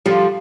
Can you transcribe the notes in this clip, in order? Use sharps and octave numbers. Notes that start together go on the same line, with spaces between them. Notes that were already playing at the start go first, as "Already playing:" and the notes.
D3 F3 G3